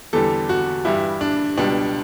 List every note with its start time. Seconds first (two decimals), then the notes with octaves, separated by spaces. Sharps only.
0.13 E2 D3 G3 A4
0.49 F#4
0.85 G2 E3 G3 E4
1.21 D4
1.57 C#2 B2 G3 D4